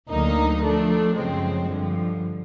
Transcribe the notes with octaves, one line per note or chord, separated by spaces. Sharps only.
D2 D3 F#3 A#3 D#4
F3 A3 D4
F#2 C#3 F3 G#3 C4
G2 D3 F3